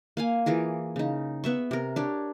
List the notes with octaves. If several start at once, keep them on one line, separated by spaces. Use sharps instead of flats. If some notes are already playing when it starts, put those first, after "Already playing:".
A#3 F5 G#5
E3 F4 G#4 A#4
C#3 D#4
B3 E5 C#6
C3 A#4
D4 G4 C#5